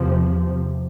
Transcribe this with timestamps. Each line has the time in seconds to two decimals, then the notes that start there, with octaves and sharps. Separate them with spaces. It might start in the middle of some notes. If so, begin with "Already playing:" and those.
Already playing: E2 C3 F3